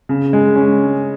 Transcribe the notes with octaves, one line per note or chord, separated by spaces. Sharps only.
C#3
G#3
C#4